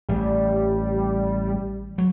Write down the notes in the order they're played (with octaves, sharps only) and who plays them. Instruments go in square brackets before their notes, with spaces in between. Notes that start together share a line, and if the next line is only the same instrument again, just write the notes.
[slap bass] A1 [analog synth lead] G3
[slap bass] F#3